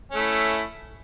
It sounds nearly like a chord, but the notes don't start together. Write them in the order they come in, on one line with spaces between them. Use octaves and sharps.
C#4 A3 E4